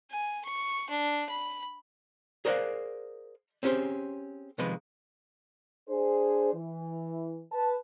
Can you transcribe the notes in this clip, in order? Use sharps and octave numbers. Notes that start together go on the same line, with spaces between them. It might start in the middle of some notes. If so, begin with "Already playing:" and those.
G#5
C#6
D4
B5
G#4 A#4 C5 D5 F5 F#5
C4 C#4 G4 G#4 C5
C3 D#3 F3 G#3 B4
D4 G#4 C5
E3
B4 A5